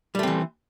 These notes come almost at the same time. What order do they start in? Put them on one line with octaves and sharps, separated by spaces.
G3 A3 C4 E3